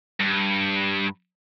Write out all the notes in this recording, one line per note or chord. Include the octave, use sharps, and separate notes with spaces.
G2